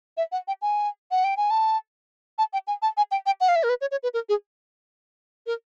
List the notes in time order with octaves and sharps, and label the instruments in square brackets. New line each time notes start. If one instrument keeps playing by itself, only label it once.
[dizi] E5
F#5
G5
G#5
F#5
G5
G#5
A5
A5
G5
G#5
A5
G#5
G5
G5
F#5
F5
E5
A#4
B4
C#5
C#5
B4
A#4
G#4
A#4